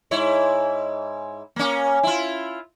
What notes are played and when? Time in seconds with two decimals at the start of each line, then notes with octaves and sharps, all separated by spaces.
0.11 G#2 E4 C#5
1.56 A#3 C#4
2.03 E4 F4